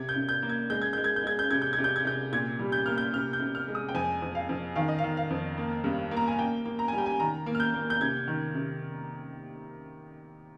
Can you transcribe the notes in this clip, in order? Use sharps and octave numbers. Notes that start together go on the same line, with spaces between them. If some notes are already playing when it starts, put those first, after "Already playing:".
Already playing: C3 G#6
G6
C3
G6
A#3
G#6
G#3 G6
G#6
G#3 G6
G#6
G6
G#3 G#6
G6
C3 G#6
G6
G#6
C3
G6
G#6
C3 G6
A#2 G#6
G3
G6
A#3 F6
G6
C3 F6
G6
C3
F6
G#3
D#6
G5
F2 G#5
F2
F5
F2
D#3 F5
D#5
F5
D#3
F5
F2
A#3
G2
A#3
A#5
G#5
A#3 G5
A#3
A#5
G#5
G3 G5
G#5
D#3 A#5
A#3
F6
G6
A#3
G6
C3 G#6
D#3
C3